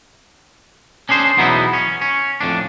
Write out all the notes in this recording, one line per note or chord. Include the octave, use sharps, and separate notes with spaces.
C#4 D4 G#4 C5
E2 B2 F#3 B3 D#4 E4
C#4
C#4
F2 A2 D4